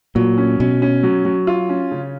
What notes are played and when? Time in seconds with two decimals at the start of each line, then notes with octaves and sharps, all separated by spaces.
0.15 A#2 F#3
0.38 C#4
0.60 B2 C#4
0.82 C#4
1.03 F#3
1.25 F#3
1.47 F4
1.69 C#4
1.91 C#3